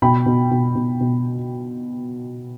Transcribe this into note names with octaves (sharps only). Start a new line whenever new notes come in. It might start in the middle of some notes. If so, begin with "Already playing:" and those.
B2 G5 B5
B2
B2
B2
B2